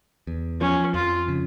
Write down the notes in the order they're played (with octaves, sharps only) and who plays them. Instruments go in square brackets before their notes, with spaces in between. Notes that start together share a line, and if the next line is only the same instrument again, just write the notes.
[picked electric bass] E2
[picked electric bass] F3 [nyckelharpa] C#4
[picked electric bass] F2 [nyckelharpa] F4
[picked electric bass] C#3